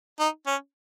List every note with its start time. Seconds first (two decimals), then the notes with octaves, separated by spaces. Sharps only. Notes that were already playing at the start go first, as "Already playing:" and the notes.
0.20 D#4
0.47 C#4